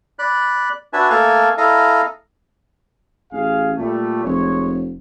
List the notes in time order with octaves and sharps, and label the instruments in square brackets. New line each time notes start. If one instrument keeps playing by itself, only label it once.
[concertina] D5 B5 F#6
D4 F#4 B4 E5 G#5 A5
A3 A#3 A4 F5 G#5 A5
E4 A4 D#5 F5 A#5
[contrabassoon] A1 [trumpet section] G#4 F5 G#5
[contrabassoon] A#2 [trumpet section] G3 A3
[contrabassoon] F1 [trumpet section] G#3 C#5